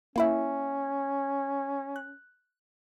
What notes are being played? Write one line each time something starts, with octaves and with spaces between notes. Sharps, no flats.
A#3 C#4 E4 E5
F#6